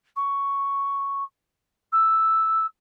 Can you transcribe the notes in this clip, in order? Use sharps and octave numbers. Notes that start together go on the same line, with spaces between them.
C#6
E6